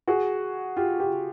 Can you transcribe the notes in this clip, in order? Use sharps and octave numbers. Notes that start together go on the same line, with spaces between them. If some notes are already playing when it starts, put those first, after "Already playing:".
F#4 G#4
F4 G4
F4 G4